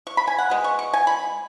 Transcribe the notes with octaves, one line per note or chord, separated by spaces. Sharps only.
C#6
B5
G#5
F#5
B2 G#3
C#6
C#6
G#5
B5